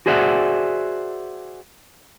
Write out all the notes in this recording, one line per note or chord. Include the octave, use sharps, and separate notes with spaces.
F#4 G#4 C5 D5 E5 F#5